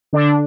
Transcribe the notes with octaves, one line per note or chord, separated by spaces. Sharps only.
D3 D4